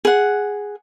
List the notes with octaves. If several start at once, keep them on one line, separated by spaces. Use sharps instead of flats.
G#4 F#5